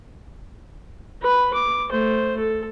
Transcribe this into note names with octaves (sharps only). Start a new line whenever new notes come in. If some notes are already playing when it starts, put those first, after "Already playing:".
B4 B5
D6
A3 C5
A4